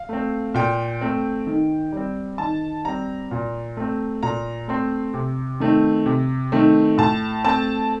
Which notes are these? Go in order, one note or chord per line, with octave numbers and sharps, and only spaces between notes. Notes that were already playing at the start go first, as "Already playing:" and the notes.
Already playing: F5
A3 C4
A#2 G5
A3 C4
D#3
G3 C4
D#3 A5
G3 C4 A#5
A#2
A3 C4
A#2 A#5
A3 C4 C6
C3
D#3 A3 C4
C3
D#3 A3 C4
A2 A5
A3 C4 A5